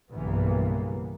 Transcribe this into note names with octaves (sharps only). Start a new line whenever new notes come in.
B1 G2 C#3 E3 A#3 B3